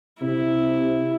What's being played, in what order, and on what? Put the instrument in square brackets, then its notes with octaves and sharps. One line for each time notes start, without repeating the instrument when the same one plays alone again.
[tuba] C3 [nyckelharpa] E4